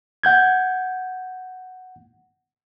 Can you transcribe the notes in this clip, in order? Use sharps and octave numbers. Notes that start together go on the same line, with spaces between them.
F#5 G6 G#6